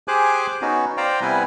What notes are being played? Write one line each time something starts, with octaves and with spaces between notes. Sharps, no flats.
G4 G#4 C5 G#5 D6 F#6
B3 C#4 D#4 F#4
C5 D5 F5 G5 A#5
C3 G3 B3 E4 B4 G#5